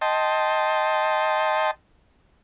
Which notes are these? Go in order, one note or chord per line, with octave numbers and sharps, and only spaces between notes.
D#5 G5 A5 C6